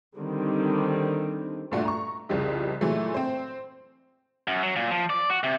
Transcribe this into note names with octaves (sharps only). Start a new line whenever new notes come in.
D3 D#3 G3 C4
G2 A#2 A3 D4 F#4
A#5 C#6
C2 F2 C#3 F3 G4 D#5
A#2 E3 F#3 G#3 A3
C4 C5
F#2
F#3
A#2
F3
D5
F#4
C3